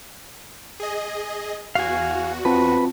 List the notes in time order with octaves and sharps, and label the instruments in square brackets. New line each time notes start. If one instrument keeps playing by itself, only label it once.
[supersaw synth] G#4 D#5
[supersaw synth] E2 F#4 [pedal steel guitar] F5 G#5
[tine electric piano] C4 F4 A5 [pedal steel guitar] B4